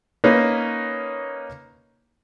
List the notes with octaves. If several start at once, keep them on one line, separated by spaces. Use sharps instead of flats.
A#3 C#4 D#4 B4